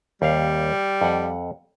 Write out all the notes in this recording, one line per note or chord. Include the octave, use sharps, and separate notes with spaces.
D#2 G3 F5
F2 F#5